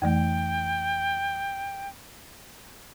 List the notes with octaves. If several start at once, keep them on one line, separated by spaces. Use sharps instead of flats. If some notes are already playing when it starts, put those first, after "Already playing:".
F2 E3 A3 G5